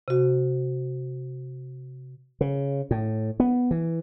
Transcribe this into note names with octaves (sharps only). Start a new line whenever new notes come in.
C3 F#4
C#3
A2
B3
E3